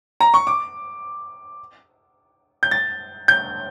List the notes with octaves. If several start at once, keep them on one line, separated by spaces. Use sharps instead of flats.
A#5
C#6
D6
G6
A6
G6